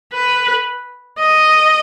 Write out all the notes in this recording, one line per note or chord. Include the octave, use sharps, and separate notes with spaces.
B4
D#5